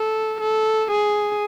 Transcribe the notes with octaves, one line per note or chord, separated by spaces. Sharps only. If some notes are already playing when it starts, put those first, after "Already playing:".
Already playing: A4
A4
G#4